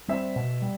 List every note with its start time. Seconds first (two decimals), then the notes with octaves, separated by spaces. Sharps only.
0.08 G3 C4 E5
0.36 B2
0.62 G3